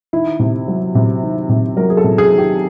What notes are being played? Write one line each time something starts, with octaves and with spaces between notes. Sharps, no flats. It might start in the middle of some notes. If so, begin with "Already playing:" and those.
D#3 E4
C3
F#3
C3
D#3
C3
F#3 A#4
G#4
A4
C3
G#4
D#3
G4